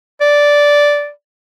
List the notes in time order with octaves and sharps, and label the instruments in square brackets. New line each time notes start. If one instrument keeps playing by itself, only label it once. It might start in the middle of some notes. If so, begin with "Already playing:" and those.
[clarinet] D5